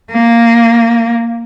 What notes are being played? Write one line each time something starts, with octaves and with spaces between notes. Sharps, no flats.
A#3